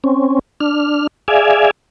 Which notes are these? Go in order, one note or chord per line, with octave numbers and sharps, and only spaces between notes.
C4 C#4
D4 F6
G#4 D5 E5 F5 G#5